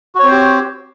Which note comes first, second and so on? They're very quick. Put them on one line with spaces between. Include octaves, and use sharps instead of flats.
F#4 C#5 C4 C5 G4